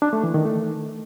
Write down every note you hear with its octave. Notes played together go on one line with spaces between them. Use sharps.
D4
A3
E3
D#3
A3